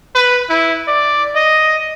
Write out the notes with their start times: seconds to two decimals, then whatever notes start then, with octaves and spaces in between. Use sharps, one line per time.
0.15 B4
0.49 E4
0.88 D5
1.36 D#5